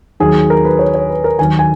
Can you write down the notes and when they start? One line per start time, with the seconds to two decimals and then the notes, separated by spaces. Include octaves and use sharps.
0.20 D#2 D#3 F#3 G#4
0.50 A#4
0.65 B4
0.79 C#5
0.94 C#5
1.09 B4
1.24 A#4
1.39 D#2 D#3 F#3 G#5
1.59 G#5